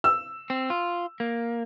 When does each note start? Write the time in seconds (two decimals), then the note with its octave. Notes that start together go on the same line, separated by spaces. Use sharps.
0.04 E6
0.50 C4
0.70 F4
1.20 A#3